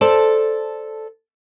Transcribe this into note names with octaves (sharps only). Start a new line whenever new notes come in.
A4 C5 D5 A5